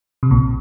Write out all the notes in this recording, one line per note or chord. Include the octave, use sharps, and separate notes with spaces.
C3
A#1 A#2